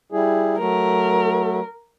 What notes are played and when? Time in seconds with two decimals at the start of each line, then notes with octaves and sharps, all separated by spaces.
0.12 G3 E4 G#4
0.59 F#3 A3 A#4